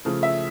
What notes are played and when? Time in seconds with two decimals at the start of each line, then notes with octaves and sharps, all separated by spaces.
0.05 C#3 F3 A3
0.23 E5